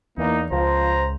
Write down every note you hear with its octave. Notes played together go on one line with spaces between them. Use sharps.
E2 E3 A#3 D#4
C#2 F3 C5 A#5